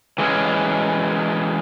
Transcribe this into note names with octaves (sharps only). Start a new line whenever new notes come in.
E3 G#3 C#4